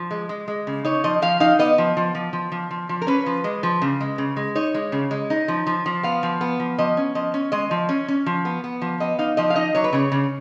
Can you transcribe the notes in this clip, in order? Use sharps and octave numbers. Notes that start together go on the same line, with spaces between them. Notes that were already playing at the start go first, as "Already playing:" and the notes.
Already playing: F3
G#3
G#3
G#3
C#3
D#4 C#5
F3 D#5
F3 F5
D#4 F5
B3 D#5
F3
F3
F3
F3
F3
F3
F3
A#4
C#4 B4
F3
G#3
F3
C#3
G#3
C#3
G#3
D#4 C#5
G#3
C#3
G#3
D#4
F3
F3
F3
B3 F5
F3
B3
F3
F3 D#5
C#4
F3 D#5
C#4
G#3 D#5
F3
C#4
C#4
F3
B3
B3
F3
B3 D#5
D#4 F5
F3 D#5
F5
D#4 D#5
F#3 C#5
B4
C#3 C#5
C#3